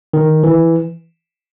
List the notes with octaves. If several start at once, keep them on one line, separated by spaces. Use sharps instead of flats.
D#3
E3